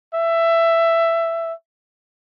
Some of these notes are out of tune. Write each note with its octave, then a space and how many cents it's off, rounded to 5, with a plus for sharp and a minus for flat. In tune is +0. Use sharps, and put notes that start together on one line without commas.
E5 +15